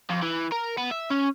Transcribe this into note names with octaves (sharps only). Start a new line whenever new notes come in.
F2
E3
A#4
B3
E5
C#4